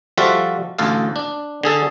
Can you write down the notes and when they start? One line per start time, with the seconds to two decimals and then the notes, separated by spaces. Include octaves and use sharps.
0.18 F3 G3 F4 F#4 A4 E5
0.79 A1 D2 A4 F5
1.16 D4
1.63 D3 G#4 A4